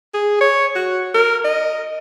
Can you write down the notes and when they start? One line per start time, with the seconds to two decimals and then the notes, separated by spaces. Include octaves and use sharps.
0.14 G#4
0.41 C#5
0.76 F#4
1.14 A#4
1.45 D#5